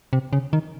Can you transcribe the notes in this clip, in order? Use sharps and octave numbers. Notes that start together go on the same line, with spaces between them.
C3
C#3
D#3